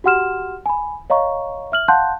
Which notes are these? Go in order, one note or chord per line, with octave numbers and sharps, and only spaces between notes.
F#4 G4 F#5 C6 F6 E7
G#5 B5
C#5 D#5 F5 A#5 C#6
E5 F6 F#7
F5 F#5 A5 C6 F#6 G6